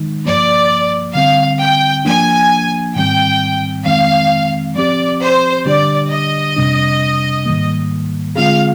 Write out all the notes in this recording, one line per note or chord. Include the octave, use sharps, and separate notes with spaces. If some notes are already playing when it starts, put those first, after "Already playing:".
Already playing: D#3 G#3 D#4
G2 F3 A#3 D5
D3 G3 C4 F5
G5
F3 A#3 D4 G#5
G#2 D#3 G3 C4 G5
F2 D#3 G#3 C4 F5
F3 C4 G4 D5
C5
D3 G3 D4 G4 D5
D#5
F2 C3 G3 D4
G#2 D#3 G3 A#3
D3 G#3 C4 F4 G#4 F5